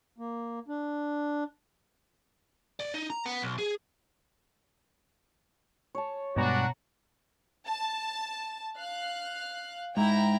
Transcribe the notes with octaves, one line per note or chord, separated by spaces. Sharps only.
A#3
D4
D5
D#4
A#5
B3
B1
G#4
C#5 A5
G2 B2 G3 G#3 D4 F#4 A#5
A5
F5 F#6
G#2 E4 G5 A#5